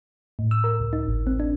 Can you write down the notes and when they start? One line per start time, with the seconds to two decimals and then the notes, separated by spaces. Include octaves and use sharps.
0.39 A2
0.51 E6
0.64 A#4
0.80 C#2
0.93 D#4
1.07 G#1
1.27 C4
1.40 D4